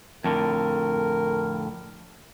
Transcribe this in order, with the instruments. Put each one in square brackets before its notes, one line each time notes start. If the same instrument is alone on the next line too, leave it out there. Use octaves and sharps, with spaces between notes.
[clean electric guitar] F2 A2 D3 [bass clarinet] A#4